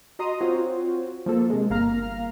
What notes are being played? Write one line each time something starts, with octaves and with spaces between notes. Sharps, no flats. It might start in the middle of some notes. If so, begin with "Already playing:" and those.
F#4 D#5 A#5 C6 D#6
C4 F4 F#4 C5 C#5
F3 A#3 A4
C3 G#3
G1 A#3 F5 A#5 F6